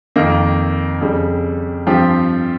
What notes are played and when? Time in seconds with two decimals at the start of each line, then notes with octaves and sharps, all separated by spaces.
0.16 F2 D#3 A#3
1.01 F2 C#3 G3
1.87 G2 F3 C4 G4